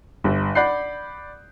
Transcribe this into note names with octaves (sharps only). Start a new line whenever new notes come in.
G1
D5 F#5 B5 F#6 G6 C7